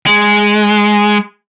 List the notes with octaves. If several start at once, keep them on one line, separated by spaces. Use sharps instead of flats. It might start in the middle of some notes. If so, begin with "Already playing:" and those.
G#3